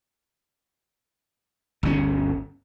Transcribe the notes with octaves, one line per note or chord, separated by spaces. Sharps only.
G1 D2 B2 C#4